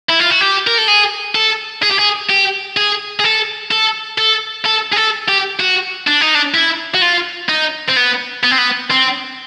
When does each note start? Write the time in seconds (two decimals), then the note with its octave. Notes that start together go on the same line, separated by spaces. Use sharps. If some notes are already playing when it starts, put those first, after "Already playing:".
0.10 E4
0.20 F4
0.31 F#4
0.41 G4
0.67 A#4
0.78 A4
0.88 G#4
1.35 A4
1.83 G#4
1.91 G4
1.99 G#4
2.30 G4
2.77 G#4
3.20 G#4
3.24 A4
3.71 A4
4.18 A4
4.66 A4
4.93 G#4
4.97 A4
5.29 G4
5.60 F#4
6.07 D4
6.21 D#4
6.35 D4
6.54 E4
6.94 F#4
7.02 F4
7.49 D#4
7.88 C4
7.96 B3
8.43 B3
8.51 C4
8.58 B3
8.91 C4